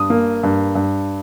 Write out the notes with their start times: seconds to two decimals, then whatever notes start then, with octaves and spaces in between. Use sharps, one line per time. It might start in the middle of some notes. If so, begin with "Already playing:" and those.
Already playing: G2 D#6
0.10 A#3
0.43 G2
0.75 G2